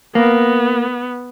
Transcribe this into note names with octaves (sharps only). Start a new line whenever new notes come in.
A#3 B3